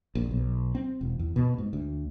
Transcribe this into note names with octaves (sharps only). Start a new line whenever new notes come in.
A#1
B1
C4
E1
E2
B2
G#2
D2